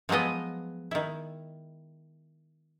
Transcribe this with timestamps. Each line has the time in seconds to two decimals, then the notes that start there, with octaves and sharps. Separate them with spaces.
0.09 F3 F#3 G#3 B3 D#5
0.91 D#3 E4